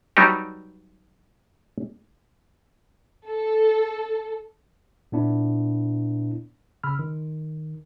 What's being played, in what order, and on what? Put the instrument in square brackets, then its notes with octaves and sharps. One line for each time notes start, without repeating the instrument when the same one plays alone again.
[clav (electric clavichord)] F#3 G3 B3 D#4 G4
[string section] A4
[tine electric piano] A#2 B3 D4 E4
C#3 B5 E6 F6
D#3